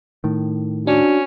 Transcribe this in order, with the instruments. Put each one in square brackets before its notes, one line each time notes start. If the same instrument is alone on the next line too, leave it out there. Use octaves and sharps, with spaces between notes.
[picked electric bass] A2 D#3
[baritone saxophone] C#4 [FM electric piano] D4 [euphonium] F#4